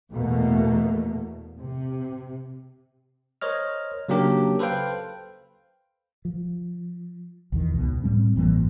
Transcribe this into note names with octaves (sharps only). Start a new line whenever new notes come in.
E2 B2 A3 A#3
C3
A#4 C5 C#5 D#5 F6
C#3 F#3 A#3 D4 G4 A#4
A4 B4 C5 F5 G5
F3
B1 E2 D#3
C#2 B2
A2 G3 C4
A1 G2 E3 A#3